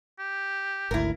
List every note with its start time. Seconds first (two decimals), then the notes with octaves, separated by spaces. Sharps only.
0.19 G4
0.91 G#1 D2 E4 A#4